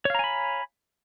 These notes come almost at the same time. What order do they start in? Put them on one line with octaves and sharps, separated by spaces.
C#5 F5 A#5 G#5 B5